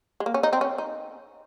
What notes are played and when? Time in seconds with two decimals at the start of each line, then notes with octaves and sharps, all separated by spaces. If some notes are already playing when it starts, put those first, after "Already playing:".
0.20 G#3
0.26 A#3
0.34 C#4
0.43 D#4
0.53 C4
0.61 C#4
0.78 D#4